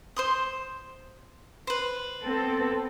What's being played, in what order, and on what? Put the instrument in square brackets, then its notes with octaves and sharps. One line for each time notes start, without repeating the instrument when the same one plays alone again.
[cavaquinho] C5 C6 D#6
B4 C5
[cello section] B3 C4 A4